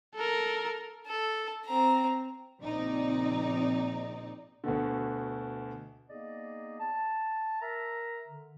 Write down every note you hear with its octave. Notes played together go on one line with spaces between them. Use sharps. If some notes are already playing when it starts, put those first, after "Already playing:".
A4 A#4
A4
C4 A#5
A#1 C#3 C4 D#4 D5
D2 B2 D3
A#3 B3 D#4 G#4 D5 D#5
A5
A#4 E5 A#5
D3